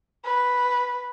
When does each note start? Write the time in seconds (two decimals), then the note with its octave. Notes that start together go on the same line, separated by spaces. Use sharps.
0.24 B4